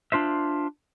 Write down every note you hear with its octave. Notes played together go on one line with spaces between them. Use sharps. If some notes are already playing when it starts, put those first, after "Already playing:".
D4 F4 C5 E5